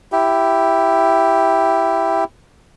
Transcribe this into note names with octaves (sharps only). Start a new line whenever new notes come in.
E4 G4